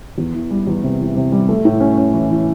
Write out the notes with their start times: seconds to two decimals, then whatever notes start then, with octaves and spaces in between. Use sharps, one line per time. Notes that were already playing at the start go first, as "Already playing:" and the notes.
0.18 E2
0.34 E3
0.51 G3
0.67 E2
0.84 C3
1.00 E3
1.16 C3
1.32 G3
1.49 A3
1.65 A2
1.80 C#4
1.98 C#4
2.14 E3
2.30 E3